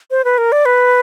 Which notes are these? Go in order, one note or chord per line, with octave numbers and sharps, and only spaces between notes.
C5
B4
A#4
D5
B4